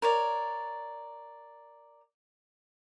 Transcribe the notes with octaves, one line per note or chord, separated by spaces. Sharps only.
A#4 C#5 D5